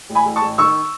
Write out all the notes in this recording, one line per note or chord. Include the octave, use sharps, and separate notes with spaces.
A1
G#5 B5
A1
A5 C#6
A1
D#3 C#6 E6